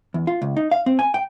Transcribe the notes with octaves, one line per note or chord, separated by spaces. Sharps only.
E2
F4
C#2
D#4
F5
C4
G#5
G5